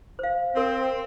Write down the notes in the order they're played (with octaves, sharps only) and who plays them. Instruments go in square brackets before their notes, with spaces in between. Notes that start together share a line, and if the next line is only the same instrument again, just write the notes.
[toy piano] C5 F5
[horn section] C4 [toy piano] A#4